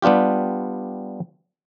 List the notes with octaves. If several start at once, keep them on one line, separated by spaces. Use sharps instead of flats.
G3 B3 D4 F4 G4